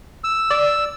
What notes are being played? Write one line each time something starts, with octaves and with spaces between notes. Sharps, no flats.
E6
D5